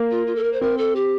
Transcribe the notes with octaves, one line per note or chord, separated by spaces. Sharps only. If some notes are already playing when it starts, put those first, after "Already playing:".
Already playing: A#3
F4
F4
A4
A#4
C5
C4 A#4
A4
G4